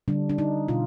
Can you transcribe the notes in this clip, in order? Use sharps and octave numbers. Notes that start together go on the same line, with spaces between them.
D3 G3 D4
D4
D#4
B2 F4